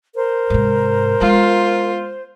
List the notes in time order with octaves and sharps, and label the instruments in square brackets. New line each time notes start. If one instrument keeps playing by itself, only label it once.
[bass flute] A#4 [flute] C5
[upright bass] G#2 C3
[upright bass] G#3 B3 [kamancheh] F4